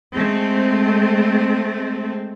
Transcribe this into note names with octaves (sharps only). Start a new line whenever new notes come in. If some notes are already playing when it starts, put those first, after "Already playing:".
G#3 A3 C4